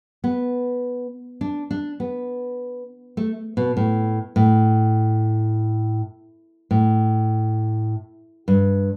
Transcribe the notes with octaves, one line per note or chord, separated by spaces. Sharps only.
B3
D4
D4
B3
A3
B2
A2
A2
A2
G2